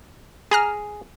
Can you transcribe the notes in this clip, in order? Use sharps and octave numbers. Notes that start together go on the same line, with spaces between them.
G#4 G#5 A#5 F6